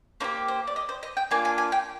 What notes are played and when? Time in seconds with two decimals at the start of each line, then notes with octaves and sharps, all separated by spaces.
0.20 A#3 D#4 C5
0.24 G4
0.48 C5
0.67 D5
0.76 D#5
0.89 C5
1.03 D#5
1.17 G5
1.31 A#3 D4 F4 G#5
1.45 G#5
1.58 G#5
1.72 G5